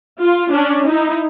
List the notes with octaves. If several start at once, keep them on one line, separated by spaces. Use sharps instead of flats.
F4
C#4 D4
D#4 E4